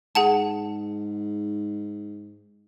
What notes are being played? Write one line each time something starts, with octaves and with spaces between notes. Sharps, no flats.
G#2 G#4 F#5 A5